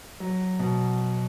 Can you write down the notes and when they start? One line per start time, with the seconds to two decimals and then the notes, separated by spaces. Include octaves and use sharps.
0.20 F#3
0.59 B2